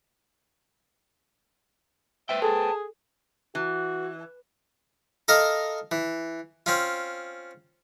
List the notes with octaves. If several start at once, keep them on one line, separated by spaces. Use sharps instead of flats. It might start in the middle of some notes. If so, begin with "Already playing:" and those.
B4 C5 E5 G5
G#4 A4 A5
E3 F#4
A4 A#4 D#5 F5
E3
C4 C#4 F4